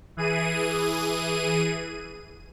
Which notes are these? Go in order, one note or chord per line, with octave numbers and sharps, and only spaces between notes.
E3 G#4 D#7